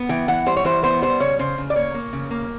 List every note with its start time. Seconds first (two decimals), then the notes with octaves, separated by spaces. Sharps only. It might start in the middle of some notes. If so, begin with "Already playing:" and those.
Already playing: B3
0.09 E3 G5
0.28 E3 F#5
0.46 G3 C5
0.57 C#5
0.65 E3 C5
0.83 B3 C5
1.02 G3 C5
1.20 C#3 C#5
1.39 C#3 C5
1.58 C#3
1.70 D5
1.76 A#3 C#5
1.94 A#3
2.13 C#3
2.31 A#3